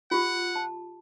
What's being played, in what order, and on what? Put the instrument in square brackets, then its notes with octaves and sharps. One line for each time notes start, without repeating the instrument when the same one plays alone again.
[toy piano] F4 G4 [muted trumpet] F#5
[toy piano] A5